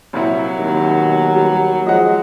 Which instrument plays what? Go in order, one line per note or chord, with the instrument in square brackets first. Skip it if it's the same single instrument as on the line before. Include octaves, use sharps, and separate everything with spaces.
[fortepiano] C2 A#2 E4 [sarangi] F#3
[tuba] D#2
[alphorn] B2
[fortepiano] G3 [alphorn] F#4
[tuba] F3 [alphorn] G#3 [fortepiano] D#5 F#5